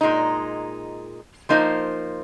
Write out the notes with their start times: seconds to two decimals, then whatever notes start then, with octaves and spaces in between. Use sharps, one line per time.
0.01 A#2 G#3 D#4
1.49 F3 A#3 D#4 C5